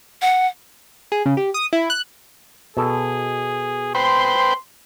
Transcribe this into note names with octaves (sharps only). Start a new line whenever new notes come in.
F#5
G#4
C#3
G4
D#6
E4
F#6
B2 G#4 A4
B4 C5 G5 C6